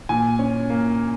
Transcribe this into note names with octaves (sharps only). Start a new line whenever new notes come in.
A#2 G#5
C#4
A#3